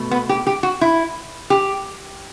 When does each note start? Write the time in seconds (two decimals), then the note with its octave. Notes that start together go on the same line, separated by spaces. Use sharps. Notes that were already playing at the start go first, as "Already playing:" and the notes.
Already playing: B2 A3
0.11 B3
0.29 G4
0.47 G4
0.63 F#4
0.81 E4
1.50 G4